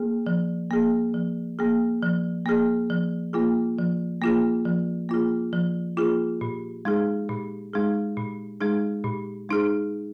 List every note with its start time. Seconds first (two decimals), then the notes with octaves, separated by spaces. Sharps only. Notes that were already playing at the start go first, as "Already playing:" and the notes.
Already playing: A#3 G#4
0.27 F3
0.70 A#3 G#4
1.14 F3
1.59 A#3 G#4
2.02 F3
2.46 A#3 G#4
2.90 F3
3.33 A#3 F4 G#4
3.78 F3
4.22 A#3 F4 G#4
4.65 F3
5.09 A#3 F4 G#4
5.53 F3
5.97 A#3 F4 G#4
6.41 A#2
6.85 G#3 D#4 G#4
7.29 A#2
7.73 G#3 D#4 G#4
8.17 A#2
8.61 G#3 D#4 G#4
9.04 A#2
9.49 G#3 D#4 G#4